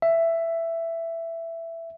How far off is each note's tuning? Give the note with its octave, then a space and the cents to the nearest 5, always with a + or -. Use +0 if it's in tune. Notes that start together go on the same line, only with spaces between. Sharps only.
E5 +10